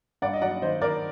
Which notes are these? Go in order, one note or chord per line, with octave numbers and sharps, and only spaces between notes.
G2 D5 F#5
D#5
F#3 D5 F#5
D#3 C5 D#5
D#3 A#4 D5